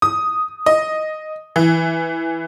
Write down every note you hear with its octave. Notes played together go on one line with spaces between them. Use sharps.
D#6
D#5
E3